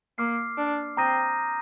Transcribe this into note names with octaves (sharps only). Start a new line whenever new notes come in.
A#3 D6 F6 C7
D4
C4 A#5 D#6 G6 A#6 D#7